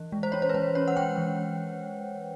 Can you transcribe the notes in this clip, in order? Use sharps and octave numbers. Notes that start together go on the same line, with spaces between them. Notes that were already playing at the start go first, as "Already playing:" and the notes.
Already playing: E3
G#3
C5
C#4 C#5
C5
B4
G#3 C5
C#4 C#5
F#5
G#3 G5
E3